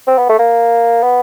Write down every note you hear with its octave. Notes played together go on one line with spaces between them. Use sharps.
C4
B3
A3
A#3
B3